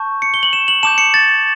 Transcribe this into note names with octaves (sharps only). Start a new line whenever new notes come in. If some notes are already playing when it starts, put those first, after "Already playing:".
Already playing: A5 C#6 G6
C#7
G7
F#7
E7
F#7
A5 D6 G6 E7
C#7
A6